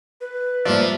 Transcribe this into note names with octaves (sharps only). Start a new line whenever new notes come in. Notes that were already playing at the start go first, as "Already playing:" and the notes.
B4
G#2 F3 G3 A#3 D5 E5